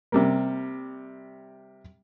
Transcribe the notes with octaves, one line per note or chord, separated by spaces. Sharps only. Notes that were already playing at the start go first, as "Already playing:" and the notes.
C3 G3 A#3